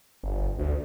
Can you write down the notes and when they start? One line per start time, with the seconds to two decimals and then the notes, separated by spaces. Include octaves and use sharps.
0.23 G1
0.59 D2